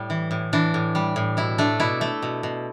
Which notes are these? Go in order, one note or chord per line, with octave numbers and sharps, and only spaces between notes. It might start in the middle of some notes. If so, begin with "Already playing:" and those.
Already playing: A2 G3
E3
A2
E3 D4
A2
G3
A2
B2 E4
A3 D4
B2 E4
A3
B2
B2